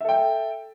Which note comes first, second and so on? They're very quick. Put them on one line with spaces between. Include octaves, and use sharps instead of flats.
E5 A4 G5